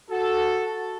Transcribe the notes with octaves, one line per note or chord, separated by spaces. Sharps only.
F#4 A4